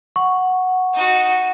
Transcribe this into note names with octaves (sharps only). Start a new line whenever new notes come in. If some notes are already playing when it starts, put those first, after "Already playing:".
F#5 C#6
D#4 F#4